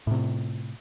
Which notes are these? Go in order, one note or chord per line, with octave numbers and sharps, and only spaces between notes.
A2 C3